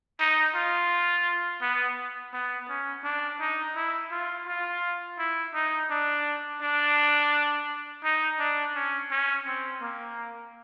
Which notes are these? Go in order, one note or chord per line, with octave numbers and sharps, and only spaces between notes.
D#4
F4
B3
B3
C#4
D4
D#4
E4
F4
F4
E4
D#4
D4
D4
D#4
D4
C#4
C#4
C4
A#3